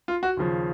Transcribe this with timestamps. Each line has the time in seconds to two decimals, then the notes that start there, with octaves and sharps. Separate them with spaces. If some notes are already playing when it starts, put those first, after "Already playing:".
0.08 F4
0.23 F#4
0.37 D#2 C#3 F3